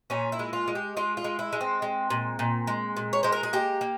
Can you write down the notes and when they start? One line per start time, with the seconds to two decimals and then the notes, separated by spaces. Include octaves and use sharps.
0.10 A#2 C#4
0.32 E4
0.39 G#3
0.53 F4
0.68 G#3
0.75 G4
0.97 G#3 F4
1.17 F4
1.24 G#3
1.39 E4
1.53 G#3
1.61 C4
1.82 G#3
2.10 A#2
2.39 A#2
2.67 G#3
2.97 A#2
3.13 C#5
3.23 G#3 C5
3.32 A#4
3.43 G#4
3.53 A#3 G4
3.81 A#3